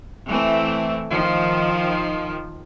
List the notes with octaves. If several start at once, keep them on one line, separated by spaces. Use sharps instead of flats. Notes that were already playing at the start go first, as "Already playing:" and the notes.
E3 A3 C4
D#3 F3